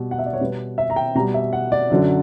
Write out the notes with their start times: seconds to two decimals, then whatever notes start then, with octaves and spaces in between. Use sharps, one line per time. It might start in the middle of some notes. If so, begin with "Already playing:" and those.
Already playing: B2 G3
0.11 F#5
0.19 E5
0.26 D5
0.33 C#5
0.40 B2 G3 B4
0.78 E5
0.90 A#5
0.96 G5
1.15 B2 A#5
1.19 G3
1.34 E5
1.53 F#5
1.72 D5
1.90 F#2 D3 F#3